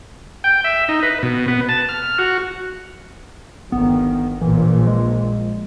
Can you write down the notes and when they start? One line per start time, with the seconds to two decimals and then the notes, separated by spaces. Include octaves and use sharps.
0.44 G5
0.64 E5
0.89 D#4
1.03 B4
1.23 B2
1.48 B3
1.69 A5
1.89 F6
2.18 F#4
3.72 G1 D#3 B3
4.42 A#1 A#2 E3
4.87 G#3